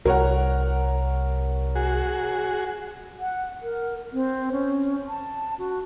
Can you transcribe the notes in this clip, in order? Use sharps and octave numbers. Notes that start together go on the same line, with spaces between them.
C2 A#4 C#5 F#5
F#4 G#4
F#5
A#4
C4
C#4
A5
F#4